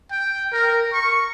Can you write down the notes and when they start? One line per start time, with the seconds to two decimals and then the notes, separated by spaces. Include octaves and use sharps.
0.11 G5
0.53 A#4
0.93 C#6